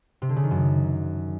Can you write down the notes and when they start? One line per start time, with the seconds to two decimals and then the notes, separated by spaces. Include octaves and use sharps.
0.22 C3
0.29 D3
0.36 C#3
0.44 D#3
0.51 F#2